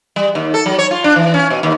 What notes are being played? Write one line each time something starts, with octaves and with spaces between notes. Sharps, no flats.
G3
D#2
A4
F#3
C#5
F4
D4
E3
C#4
B2
D#2